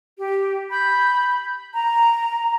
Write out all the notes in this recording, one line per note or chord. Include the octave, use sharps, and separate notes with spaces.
G4
B5 G6
A#5